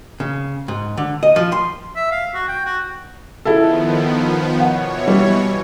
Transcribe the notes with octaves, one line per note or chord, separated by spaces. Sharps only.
C#3
G#2
D3
D#5
F3
C6
E5
F5
F#4
G5
F#4
D#3 F3 B3 E4 G#4 A4
B2 E3 C#5 F#5
G3